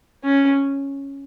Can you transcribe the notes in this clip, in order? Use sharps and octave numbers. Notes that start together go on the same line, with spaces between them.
C#4